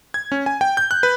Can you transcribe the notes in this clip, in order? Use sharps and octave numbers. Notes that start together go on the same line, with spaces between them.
G#6
C#4
G#5
G5
G6
F#6
B4